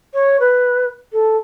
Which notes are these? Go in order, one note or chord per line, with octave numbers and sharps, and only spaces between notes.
C#5
B4
A4